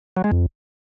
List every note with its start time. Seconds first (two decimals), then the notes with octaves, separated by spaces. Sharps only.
0.17 F#3
0.24 G#3
0.32 F2